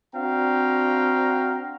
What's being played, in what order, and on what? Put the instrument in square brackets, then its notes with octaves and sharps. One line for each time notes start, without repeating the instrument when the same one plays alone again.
[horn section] C4 D4 F#4 F5 G5 A#5